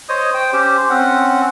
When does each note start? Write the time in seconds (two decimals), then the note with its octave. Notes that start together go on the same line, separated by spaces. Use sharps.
0.09 C5 C#5 D#5 D#6
0.34 C5 G5
0.53 C#4 G4 C5
0.90 C4 C#4 F#5